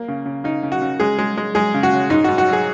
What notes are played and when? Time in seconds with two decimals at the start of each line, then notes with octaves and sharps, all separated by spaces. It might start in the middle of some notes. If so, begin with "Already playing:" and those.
Already playing: A#3
0.08 C#3
0.26 C#3
0.44 C#3 D#4
0.63 C#3
0.72 F#4
0.82 C#3
1.00 G#3 G#4
1.18 G#3
1.37 G#3
1.55 G#3 G#4
1.74 C#3
1.83 F#4
1.92 C#3
2.10 G#2 D#4
2.24 G#2 F#4
2.38 F#4
2.48 F#3 G#4